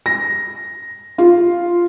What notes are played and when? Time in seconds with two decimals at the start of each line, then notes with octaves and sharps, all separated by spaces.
0.06 A#6
1.18 F4